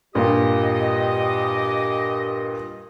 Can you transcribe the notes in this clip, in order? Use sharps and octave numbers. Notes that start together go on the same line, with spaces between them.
G2 A#2 G4 D#5